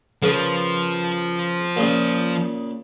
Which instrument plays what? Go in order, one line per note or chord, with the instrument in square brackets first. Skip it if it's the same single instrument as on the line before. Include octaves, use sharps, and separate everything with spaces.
[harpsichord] C#3 A#4 B4 [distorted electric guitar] F3
[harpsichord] A#2 C#3 D#5